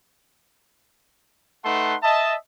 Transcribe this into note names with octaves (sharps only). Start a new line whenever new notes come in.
A3 D#4 B4 F#5 A5 C6
D#5 E5 A5